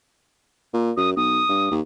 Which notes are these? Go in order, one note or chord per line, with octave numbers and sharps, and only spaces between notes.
A#2
F#2 D#6
B1 D#6
G2
D#2